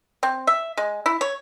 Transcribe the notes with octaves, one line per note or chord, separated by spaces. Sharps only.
C4
E5
G#3
E4
C#5